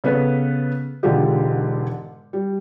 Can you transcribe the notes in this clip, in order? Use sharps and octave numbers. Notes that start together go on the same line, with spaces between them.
C#3 B3 A4 B4
E1 G#2 D3 G#3 F4 G4
G3